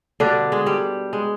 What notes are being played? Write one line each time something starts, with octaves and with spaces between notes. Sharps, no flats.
B2 D3 G3 D4
G#3
G3
G#3